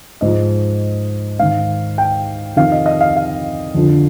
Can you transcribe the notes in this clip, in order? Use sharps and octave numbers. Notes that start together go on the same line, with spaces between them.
G#2 F3 D#5
G#2 D#3 F5
G5
F2 C3 D#3 F5
D#5
D#5
F5
F5
F2 D3 F3